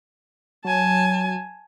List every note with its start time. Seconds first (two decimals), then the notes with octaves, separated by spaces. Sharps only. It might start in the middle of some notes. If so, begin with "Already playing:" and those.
0.65 F#3 G#5 A5